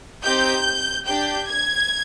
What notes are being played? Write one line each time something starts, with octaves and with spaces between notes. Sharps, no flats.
C4 D#4 G4 G6
D4 G4 G6
G#6